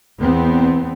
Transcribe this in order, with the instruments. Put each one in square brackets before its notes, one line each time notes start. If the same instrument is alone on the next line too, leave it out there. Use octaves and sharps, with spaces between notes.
[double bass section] E2 B3 C4